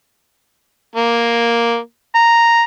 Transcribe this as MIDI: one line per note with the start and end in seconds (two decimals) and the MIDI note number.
0.96 1.78 58
2.15 2.62 82